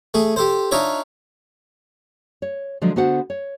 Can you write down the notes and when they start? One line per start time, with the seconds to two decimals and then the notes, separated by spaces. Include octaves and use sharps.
0.14 A3 G#4
0.36 G4 A4 C5
0.71 D4 D#4 F4 C#5 D5 E5
2.42 C#5
2.82 D3 F3 F#3 G#3 A4
2.96 D3 B3 F#4 A4 C5 F#5
3.30 C#5